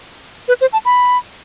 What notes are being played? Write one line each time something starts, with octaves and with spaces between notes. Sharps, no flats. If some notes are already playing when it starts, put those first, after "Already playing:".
B4
C5
A5
B5